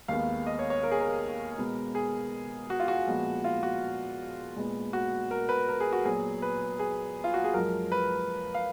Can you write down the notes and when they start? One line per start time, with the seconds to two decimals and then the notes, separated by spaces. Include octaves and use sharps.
0.08 D#2 D#3 G#3 B3 F5
0.47 D#5
0.59 C#5
0.70 C#5
0.83 A#4
0.91 G#4
1.00 A#4
1.58 B2 G#3 B3
1.95 G#4
2.70 F#4
2.80 F4
2.88 F#4
3.07 A#2 F3 G#3 B3
3.44 F4
3.63 F#4
4.56 A#2 G#3 B3
4.93 F#4
5.31 A#4
5.49 B4
5.69 A#4
5.80 G#4
5.93 F#4
6.05 A#2 F#3 B3 G#4
6.42 B4
6.79 G#4
7.24 F4
7.34 F#4
7.44 G#4
7.54 F#2 F3 G#3 A#4
7.92 B4
8.55 F5